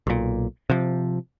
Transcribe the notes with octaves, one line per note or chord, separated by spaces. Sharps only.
B1 A#2
C3 F3